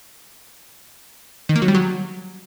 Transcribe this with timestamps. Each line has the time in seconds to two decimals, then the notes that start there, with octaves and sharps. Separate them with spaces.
1.49 D#3
1.56 A#3
1.62 F#3
1.68 G3
1.75 F#3